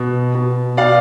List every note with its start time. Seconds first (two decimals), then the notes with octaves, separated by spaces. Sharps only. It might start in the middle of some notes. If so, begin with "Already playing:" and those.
Already playing: B2
0.35 B2
0.77 B2 D5 F5